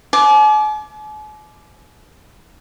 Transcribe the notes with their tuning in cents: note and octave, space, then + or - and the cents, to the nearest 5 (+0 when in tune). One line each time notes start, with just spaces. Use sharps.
G#5 +45 D6 +0